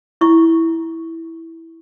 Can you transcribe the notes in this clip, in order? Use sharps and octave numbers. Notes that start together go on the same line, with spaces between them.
E4 C#6